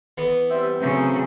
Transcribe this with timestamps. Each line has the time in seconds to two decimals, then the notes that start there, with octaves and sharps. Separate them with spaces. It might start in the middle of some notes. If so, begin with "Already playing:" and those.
0.18 E3 B3 B4
0.49 G3 C4 E5
0.81 C#3 F#3 A3 C4